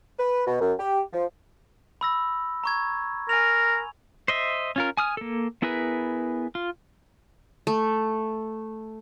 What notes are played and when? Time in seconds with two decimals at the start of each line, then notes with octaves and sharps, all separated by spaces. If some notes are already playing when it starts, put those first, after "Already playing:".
0.18 B4
0.46 B2
0.60 F#2
0.79 G4
1.13 F3
2.01 B5 E6 A#6
2.64 A#5 C#6 G#6
3.29 A#4 G#5 F7
4.28 C5 D#5 E5
4.76 C#4 F4 A#4
4.97 G#5 D#6 F6
5.17 A#3 A4
5.62 B3 E4 G#4 A#4 B4
6.55 F4
7.67 A3